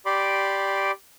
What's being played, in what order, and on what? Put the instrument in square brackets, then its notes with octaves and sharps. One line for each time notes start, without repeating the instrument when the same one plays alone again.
[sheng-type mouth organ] G4 D5 B5 C6 D6